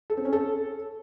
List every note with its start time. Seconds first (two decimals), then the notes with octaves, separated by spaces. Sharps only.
0.10 A4
0.17 C4
0.25 C#4
0.33 A4